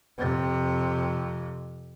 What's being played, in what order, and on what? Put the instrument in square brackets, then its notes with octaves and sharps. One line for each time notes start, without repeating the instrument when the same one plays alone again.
[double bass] F2 C3